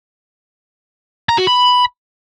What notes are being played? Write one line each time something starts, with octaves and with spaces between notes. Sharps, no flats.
A#5
F#4
B5